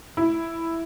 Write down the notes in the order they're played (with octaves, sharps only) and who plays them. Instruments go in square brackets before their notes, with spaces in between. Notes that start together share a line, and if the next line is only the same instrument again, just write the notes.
[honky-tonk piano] E4